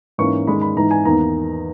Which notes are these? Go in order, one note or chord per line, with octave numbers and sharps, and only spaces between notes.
G#2 E3 A#3 C#4 C#6
G#2 D#3 G#3 B5
B5
G#2 E3 G#3 D#4 A#5
G#5
E2 D#3 A#3 D#4 A#5